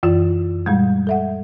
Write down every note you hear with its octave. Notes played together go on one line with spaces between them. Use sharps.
F#2 E3 F4
A#2 G3 G#3
A4 E5 F#5